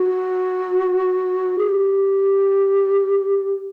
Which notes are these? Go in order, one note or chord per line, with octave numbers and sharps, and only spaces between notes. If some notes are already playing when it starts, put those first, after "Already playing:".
Already playing: F#4
G#4
G4